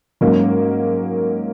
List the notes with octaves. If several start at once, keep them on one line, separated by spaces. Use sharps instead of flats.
G#2 F#3 A#3 C#4